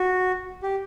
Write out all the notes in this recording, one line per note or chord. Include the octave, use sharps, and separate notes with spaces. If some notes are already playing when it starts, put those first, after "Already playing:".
Already playing: F#4
G4